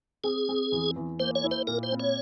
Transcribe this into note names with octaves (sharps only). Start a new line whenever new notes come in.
C4 G#4
C4
E2
E2
A#3 C5
C#5
E4
C5
A#2 A#4
C5
C4
C#5